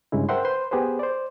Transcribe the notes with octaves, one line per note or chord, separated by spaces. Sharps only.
G2 C#3 G#3 E4
A#4 C5 E5 F#5 G5 C6
B4 C5 C6
B3 G4 G#4 B4 C5
C5 D5